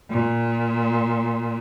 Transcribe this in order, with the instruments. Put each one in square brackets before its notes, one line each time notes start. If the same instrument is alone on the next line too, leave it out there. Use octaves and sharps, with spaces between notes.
[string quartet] A#2